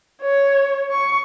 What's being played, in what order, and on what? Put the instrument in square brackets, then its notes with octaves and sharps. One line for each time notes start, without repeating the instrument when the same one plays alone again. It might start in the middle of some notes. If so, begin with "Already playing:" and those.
[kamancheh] C#5
C#6